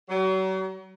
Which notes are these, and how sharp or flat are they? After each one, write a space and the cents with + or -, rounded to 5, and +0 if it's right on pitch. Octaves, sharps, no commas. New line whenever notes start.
F#3 +40